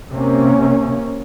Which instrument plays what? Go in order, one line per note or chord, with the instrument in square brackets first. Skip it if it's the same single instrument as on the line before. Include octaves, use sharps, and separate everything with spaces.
[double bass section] C3 A#3 C#4